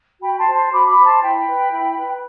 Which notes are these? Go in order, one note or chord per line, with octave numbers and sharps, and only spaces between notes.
F#4 G5 B5
A5 C6
C5
A5 C6
F#4 B5 D6
B5 D6
C5
A5 C6
E4 G5 B5
B4
E4
B4